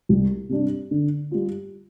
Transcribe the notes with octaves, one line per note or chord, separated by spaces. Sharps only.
C2
C3 G3 D4
D3
G3 F4